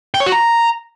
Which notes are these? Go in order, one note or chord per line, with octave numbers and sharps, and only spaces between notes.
G5
C#5
F#4
A#5